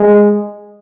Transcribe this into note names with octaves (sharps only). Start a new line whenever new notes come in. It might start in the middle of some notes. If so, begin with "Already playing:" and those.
Already playing: G#3